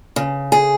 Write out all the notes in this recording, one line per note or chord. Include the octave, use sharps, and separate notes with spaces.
C#3
G#4